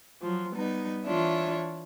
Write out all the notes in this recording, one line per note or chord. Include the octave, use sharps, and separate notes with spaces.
F3 F#3
G3 B3 D#4
E3 D4 F4 C#5 E5